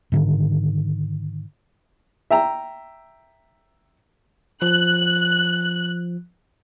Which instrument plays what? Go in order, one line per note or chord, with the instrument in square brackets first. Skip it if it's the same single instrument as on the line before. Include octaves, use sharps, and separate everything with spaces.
[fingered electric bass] G#2 D3 D#3
[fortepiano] E5 G5 A#5
[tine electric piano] F3 [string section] F#6